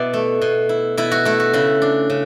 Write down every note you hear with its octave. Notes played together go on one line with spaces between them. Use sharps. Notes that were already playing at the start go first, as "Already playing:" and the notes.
Already playing: B2 E4 B4 D5 E5
A3
B2
E4
B2 E4
F#4
A3 E4
F#4
C#3 E4
D4
C#3